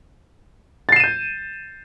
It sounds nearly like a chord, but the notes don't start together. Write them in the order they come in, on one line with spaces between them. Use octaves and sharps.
A6 C7 E7 D#7 G6